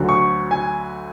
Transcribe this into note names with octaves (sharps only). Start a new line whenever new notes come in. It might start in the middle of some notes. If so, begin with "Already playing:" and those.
Already playing: D2 D3 F#3
C#6
G#5